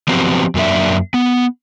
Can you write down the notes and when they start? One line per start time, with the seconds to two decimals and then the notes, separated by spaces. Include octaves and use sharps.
0.08 F3 F#3 B3 C4 G4
0.55 F#2 F#3 A#3 D4 E5
1.14 B3